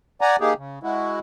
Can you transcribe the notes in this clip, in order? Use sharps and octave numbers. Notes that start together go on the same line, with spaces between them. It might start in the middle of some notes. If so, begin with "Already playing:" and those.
D5 F#5 G#5 A#5
A#3 D#4 G4 G#4
C#3
G#3 E4 F#4